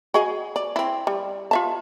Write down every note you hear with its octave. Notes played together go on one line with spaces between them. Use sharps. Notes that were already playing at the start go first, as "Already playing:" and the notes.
F#4 G#4 D#5
D5
C4 E4
G3
F4 E5 A5